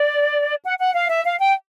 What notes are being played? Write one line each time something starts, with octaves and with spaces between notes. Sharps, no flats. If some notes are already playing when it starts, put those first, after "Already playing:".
Already playing: D5
F#5
F#5
F5
E5
F5
G5